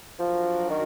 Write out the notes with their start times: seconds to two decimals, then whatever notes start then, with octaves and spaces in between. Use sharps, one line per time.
0.19 F3 F#3 D4 F#4 A#4
0.69 D#3